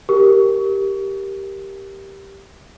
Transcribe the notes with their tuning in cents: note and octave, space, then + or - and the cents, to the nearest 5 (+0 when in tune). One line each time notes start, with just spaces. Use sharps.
G4 +0 A#4 +0